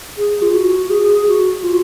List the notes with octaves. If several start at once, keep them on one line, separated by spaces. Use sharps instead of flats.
G#4
F4
F#4
G#4
F#4
F4